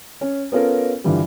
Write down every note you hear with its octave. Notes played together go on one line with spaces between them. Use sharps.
C#4
B3 C#4 F4 A4 A#4
G2 D3 E3 F3 G3